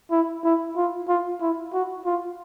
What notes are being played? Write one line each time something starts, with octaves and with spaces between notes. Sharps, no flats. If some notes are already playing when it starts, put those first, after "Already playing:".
E4
E4
F4
F4
E4
F#4
F4